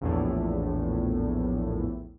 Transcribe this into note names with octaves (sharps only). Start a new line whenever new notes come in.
A#1 E2 A2